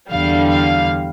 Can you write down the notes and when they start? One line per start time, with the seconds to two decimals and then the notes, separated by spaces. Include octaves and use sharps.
0.12 E2 D3 G3 F5
0.49 F5